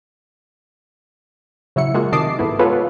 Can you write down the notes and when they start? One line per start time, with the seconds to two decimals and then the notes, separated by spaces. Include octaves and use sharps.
1.76 C#3 F#3 E4 C#7
1.94 G#3 A#3 F4 F#4 G#4
2.12 C3 D#3 D#5 A5 D6 C7
2.39 G#2 A3 B3 E4
2.59 G#3 B3 F4 A4 B4 C#5